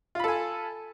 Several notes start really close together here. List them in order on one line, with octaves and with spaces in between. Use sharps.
F4 B5 A4 G#5